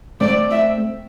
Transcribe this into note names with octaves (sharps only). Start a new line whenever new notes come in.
A3 C4 D5
E5